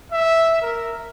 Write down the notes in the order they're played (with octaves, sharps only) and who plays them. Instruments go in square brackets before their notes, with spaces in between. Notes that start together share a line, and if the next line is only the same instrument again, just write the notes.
[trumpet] E5
A#4